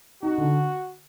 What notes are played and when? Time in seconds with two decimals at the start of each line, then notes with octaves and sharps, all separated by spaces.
0.22 D#4 F#4
0.38 D3